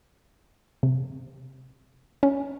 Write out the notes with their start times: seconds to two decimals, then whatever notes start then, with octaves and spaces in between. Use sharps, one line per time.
0.83 C3
2.23 C#4